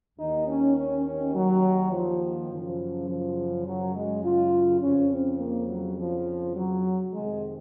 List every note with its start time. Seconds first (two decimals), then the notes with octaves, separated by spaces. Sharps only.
0.18 D#2 D#3 D#4
0.47 C#4
0.77 C#4
1.05 C#4
1.34 F#3
1.92 F3
2.49 F#2 C#3 F3
3.08 F3
3.66 F#3
3.94 G#3
4.23 F4
4.81 F2 C#3 F3 C#4
5.11 C4
5.39 A#3
5.68 F#3
5.98 F3
6.55 F#3
7.13 F2 C3 D#3 G#3